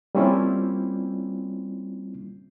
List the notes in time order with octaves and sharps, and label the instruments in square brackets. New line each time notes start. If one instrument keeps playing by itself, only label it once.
[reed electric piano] G3 A#3 C4 C#4 E4 F4